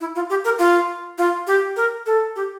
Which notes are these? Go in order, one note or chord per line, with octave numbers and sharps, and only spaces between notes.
E4
F4
G4
A#4
F4
F4
G4
A#4
A4
G4